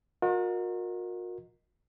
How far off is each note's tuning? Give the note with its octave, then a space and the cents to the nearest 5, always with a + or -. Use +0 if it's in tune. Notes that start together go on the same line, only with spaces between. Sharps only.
F#4 -45 A#4 +0 D#5 +0